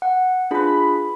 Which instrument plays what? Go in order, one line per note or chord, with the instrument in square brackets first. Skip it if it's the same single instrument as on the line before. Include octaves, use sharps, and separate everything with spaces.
[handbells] F#5
[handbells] D4 F4 G#4 [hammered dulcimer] B4 B5